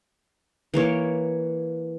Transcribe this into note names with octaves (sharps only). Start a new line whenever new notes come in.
E3 A#3 C#5